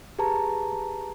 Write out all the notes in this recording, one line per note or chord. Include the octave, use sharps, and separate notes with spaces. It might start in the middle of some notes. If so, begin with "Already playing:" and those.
G4 G#4 B4 A5 A#5